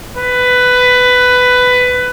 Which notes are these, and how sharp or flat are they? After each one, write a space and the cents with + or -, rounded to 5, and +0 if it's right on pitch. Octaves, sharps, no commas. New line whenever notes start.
B4 +15